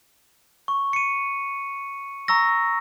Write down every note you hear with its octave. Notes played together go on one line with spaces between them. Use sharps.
C#6
C#7 D#7
A#5 C#6 E6 A#6